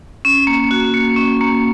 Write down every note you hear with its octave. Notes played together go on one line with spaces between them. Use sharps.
C#4
A#3
F#4
A#3
C#4
A#3